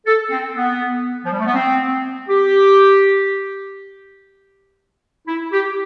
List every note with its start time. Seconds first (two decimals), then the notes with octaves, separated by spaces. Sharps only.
0.06 A4
0.30 C4
0.55 B3
1.24 F3
1.32 G3
1.40 A3
1.47 B3
1.54 C4
2.29 G4
5.27 E4
5.52 G4